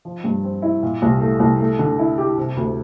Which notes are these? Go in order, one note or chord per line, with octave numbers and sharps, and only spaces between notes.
F3
G2
C4
E4
A#2
C2
A3
C2
A3
D3
E4
G4
C3
D2